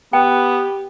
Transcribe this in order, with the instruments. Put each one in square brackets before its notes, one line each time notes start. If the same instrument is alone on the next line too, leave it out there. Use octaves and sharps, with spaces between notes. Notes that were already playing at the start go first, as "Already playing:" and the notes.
[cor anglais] B3 [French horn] G4 [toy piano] G5